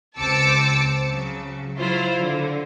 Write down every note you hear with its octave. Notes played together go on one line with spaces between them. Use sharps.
C#2 C4 A5 D6 E6 C#7
C#3 F#3
F#3 E4 F4 C5
D3